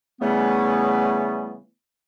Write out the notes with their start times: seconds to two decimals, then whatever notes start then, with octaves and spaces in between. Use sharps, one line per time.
0.21 C#3 E3 G3 A3 B3